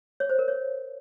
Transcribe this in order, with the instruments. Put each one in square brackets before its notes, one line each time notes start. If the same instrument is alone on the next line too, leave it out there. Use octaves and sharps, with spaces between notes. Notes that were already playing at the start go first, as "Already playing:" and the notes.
[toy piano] C#5
C5
A#4
C#5